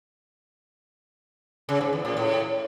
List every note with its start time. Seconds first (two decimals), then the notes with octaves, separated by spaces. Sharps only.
1.69 C#3
1.81 G#2
1.93 E2
2.05 A#2
2.17 A2